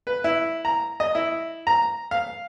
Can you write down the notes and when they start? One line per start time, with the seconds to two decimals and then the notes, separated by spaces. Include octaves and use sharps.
0.07 B4
0.24 E4
0.65 A#5
1.00 D#5
1.15 E4
1.67 A#5
2.11 F5